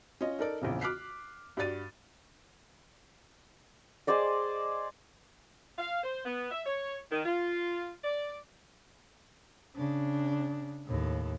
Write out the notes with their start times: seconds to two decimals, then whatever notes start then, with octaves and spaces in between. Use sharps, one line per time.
0.21 C#4 F4 D#5
0.39 D#4 A4 A#4 D5
0.62 A#1 E2 C#3
0.81 D6 F6 F#6 B6 C7
1.57 G2 F#4 D5 A6 D#7
4.07 G#4 C5 D5 D#5
5.79 F5
6.04 C5
6.25 B3
6.52 E5
6.66 C#5
7.11 D#3
7.25 F4
8.03 D5
9.76 C#3 D4
10.86 D#2 A2